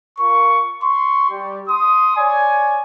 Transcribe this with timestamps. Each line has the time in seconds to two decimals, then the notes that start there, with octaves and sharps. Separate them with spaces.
0.19 F4 A#4 C#6
0.82 C6 C#6
1.31 G3 G4
1.69 C6 D#6
2.17 C#5 D5 G#5